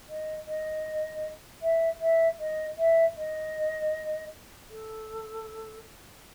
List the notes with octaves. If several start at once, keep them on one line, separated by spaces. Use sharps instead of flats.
D#5
D#5
E5
E5
D#5
E5
D#5
A4